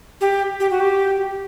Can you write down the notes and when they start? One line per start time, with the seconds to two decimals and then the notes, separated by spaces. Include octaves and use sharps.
0.21 G4
0.60 G4
0.71 F#4
0.80 G4